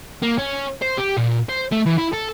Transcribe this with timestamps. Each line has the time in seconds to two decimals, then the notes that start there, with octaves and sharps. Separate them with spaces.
0.22 A#3
0.38 C#4
0.82 C5
0.97 G4
1.17 A#2
1.49 C5
1.72 A3
1.86 E3
1.98 E4
2.13 A4